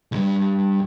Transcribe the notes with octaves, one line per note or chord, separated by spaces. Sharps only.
C2 G2